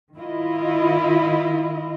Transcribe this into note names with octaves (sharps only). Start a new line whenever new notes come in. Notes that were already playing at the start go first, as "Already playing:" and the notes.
D#3 E4 F4 D#5